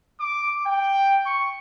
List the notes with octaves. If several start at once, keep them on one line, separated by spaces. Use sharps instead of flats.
D6
G5
C#6